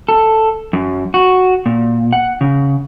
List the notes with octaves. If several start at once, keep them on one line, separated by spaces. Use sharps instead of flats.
A4
F#2
F#4
A#2
F#5
C#3